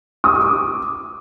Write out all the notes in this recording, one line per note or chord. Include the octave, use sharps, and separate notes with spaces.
D#6
C#6
D6